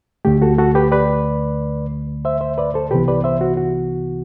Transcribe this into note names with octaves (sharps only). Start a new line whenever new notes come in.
D2 D3 A3 G4
F#4 A4
F#4 A4
G4 B4
B4 D5
C5 E5
C5 E5
B4 D5
A4 C5
C2 C3 E3 B3 G4 B4
B4 D5
C5 E5
F#4
F#4